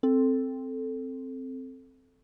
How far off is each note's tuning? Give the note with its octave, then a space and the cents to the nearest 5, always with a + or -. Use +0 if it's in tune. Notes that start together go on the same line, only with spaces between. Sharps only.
C4 +0 A4 +0